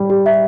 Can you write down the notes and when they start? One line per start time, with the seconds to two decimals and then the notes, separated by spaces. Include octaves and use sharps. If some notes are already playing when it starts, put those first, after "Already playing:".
Already playing: G3
0.10 G4
0.26 E5